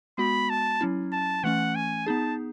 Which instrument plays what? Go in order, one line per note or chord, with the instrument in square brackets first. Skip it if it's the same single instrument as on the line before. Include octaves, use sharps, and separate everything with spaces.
[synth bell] G#3 B3 F#4 [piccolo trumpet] B5
[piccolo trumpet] A5
[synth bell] F#3 C#4 E4
[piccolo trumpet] A5
[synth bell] E3 A3 C#4 [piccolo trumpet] F#5
[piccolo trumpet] G#5
[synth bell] B3 D#4 G#4 [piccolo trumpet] A5